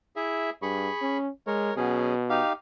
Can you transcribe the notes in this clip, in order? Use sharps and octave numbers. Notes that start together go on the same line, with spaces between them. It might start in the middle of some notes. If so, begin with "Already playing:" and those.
E4 G#4 E5
G2 G#4 B5 C#6
C#4
G#3 A#4 C#5
B2 F#3 C#4 G#4
D#4 G4 F5